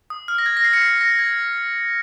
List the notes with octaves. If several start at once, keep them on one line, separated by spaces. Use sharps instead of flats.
D#6
F6
A#6
G#6
A#6
C7
C#7
C7
A#6
G#6